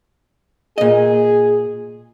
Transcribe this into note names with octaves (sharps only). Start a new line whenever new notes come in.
A#2 G#4 D#5